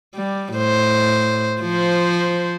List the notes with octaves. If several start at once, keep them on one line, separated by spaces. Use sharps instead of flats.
G3
A2 C5
F3 C5